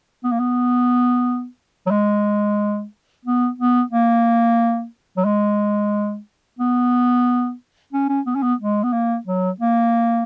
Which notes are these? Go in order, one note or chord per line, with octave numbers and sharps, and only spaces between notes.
B3
A#3
B3
F#3
G#3
B3
B3
A#3
F#3
G#3
B3
C#4
C#4
B3
C#4
B3
G#3
B3
A#3
F#3
A#3